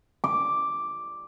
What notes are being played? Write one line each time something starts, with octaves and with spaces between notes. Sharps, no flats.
D6